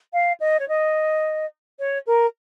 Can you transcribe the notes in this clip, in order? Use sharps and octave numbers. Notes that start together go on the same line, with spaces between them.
F5
D#5
C#5
D#5
C#5
A#4